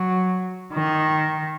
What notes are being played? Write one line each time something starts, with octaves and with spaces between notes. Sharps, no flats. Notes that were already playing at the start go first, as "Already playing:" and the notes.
Already playing: F#3
D#3